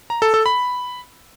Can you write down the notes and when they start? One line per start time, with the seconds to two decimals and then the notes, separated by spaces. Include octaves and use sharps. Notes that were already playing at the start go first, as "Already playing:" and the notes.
0.10 A#5
0.22 A4
0.34 A4
0.46 B5